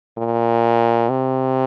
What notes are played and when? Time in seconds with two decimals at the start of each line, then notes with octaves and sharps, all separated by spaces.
0.17 A#2
1.09 C3